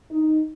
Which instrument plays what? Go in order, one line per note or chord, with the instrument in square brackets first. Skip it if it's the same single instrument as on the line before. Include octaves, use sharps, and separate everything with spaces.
[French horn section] D#4